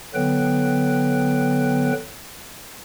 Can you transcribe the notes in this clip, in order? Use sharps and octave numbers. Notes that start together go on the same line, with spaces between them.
D3 F#3 B3 B4 G5